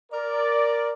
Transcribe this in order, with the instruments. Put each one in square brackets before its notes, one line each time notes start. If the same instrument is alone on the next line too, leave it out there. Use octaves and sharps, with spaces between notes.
[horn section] A#4 [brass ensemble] D5